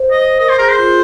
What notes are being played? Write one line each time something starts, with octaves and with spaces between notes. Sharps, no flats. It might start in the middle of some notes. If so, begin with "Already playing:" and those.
Already playing: C5
D#5
A#4 D#5
C5
G#4 A#4
C5
F4